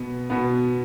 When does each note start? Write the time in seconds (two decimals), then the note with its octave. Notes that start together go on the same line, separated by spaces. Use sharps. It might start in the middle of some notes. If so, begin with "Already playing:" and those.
Already playing: B2 B3
0.30 B2 B3